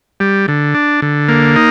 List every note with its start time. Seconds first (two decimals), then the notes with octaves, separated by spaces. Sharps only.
0.20 G3
0.48 D3
0.74 D4
1.02 D3
1.28 A#3
1.56 D#4